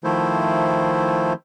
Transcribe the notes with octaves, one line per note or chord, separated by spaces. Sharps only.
D#3 F3 A3 E4 C5